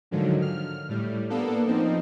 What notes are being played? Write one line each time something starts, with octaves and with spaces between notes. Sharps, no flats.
G#2 D3 D#3 F3 F#3
F6
A2 G3
A#3 B3 D4 A4
F3 C4 D#4